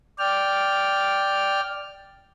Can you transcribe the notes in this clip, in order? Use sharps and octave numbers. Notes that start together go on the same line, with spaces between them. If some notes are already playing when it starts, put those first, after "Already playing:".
D5 G5 F6